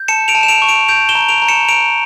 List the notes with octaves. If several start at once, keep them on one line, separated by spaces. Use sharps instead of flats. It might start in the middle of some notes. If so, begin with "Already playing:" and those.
Already playing: G6
A5 C#7 E7
D7 F7
A5
E7
D7 F7
C#6
D7 F7
G6 D7 F7
E7 G7
A#5
D7 F7
A#5
C#7 E7
A#5 D7 F7